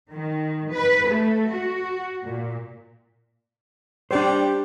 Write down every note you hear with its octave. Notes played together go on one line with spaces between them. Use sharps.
D#3
B4
A3
F#4
A#2
G3 D4 G4 C5